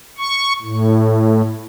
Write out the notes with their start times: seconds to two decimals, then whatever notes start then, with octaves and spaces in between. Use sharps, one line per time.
0.18 C#6
0.61 A2